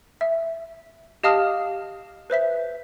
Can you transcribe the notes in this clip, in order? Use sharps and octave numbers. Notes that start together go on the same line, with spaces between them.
E5
G4 D#5 F5 A5 D#6 F6
B4 C5 E5 B6